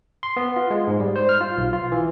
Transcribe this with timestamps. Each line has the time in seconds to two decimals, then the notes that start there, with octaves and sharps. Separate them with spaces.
0.23 C6
0.37 B3
0.56 F4
0.71 G#3
0.88 G#2
1.00 G3
1.16 C5
1.29 F6
1.41 F4
1.58 B1
1.73 F4
1.92 E3